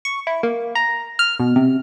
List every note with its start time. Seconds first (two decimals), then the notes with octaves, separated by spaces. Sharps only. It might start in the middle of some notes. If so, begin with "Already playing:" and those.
0.05 C#6
0.27 E4
0.43 A#3
0.75 A#5
1.19 F6
1.39 B2
1.56 C3